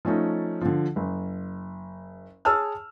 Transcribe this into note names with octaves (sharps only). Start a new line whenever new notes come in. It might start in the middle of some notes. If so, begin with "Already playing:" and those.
F3 A3 C#4 D#4
D3 F3
F#1
G#4 C#5 A5 E6 F6